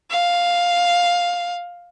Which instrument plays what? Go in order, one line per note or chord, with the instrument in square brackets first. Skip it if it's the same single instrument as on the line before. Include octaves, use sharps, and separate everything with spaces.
[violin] F5